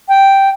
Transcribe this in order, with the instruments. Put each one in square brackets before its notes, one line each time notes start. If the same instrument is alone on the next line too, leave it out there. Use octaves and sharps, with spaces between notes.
[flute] G5